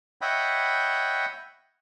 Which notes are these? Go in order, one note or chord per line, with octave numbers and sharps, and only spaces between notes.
C#5 D#5 E5 F#5 G5 B5